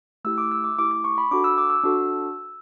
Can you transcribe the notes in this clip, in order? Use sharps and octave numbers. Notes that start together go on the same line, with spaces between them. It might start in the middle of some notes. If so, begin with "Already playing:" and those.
A3 E4 G4 E6
D6
E6
D6
A3 E4 G4 D6
D6
C#6
B5
D4 F#4 A4 D6
E6
D6
E6
D4 F#4 A4